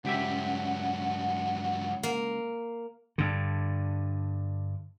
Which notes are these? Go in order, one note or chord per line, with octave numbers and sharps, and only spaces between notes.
C#2 G2 F#3 G4 E5 F#5
A#3
G2 D3